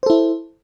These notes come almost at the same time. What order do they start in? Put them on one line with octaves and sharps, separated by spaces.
C5 A4 E4